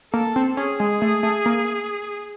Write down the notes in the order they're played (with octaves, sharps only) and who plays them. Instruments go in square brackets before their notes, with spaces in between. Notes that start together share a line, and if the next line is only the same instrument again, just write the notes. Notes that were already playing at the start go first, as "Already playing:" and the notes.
[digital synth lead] A#3 [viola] A4
[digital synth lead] C4
[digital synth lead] C#4 [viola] G#4
[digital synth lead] G#3
A3
A3
A#3